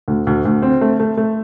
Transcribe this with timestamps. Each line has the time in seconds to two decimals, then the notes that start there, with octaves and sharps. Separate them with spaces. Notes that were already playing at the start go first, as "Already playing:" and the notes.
0.08 D2
0.27 D2
0.45 D2
0.62 C4
0.81 A3
1.00 A3
1.17 A3